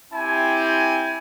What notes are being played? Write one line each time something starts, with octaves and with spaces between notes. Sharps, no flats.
C4 E4 G4 G#5